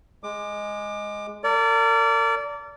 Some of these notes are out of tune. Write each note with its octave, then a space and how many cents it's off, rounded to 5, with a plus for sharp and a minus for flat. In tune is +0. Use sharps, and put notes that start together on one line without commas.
G#3 +0 D6 +25
A#4 -40 D5 -25